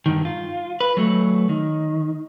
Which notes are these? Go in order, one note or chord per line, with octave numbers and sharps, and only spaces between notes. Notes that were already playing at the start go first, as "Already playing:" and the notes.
G2 D#3
F4
B4
F#3 A3
D#3